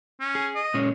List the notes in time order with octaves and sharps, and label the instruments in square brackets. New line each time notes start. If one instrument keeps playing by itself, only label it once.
[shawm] C#4
[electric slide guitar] G#4
[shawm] D#5
[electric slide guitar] A#2 G#3 C#4